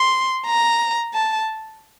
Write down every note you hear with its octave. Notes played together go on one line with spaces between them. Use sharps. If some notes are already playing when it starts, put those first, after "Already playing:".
Already playing: C6
A#5
A5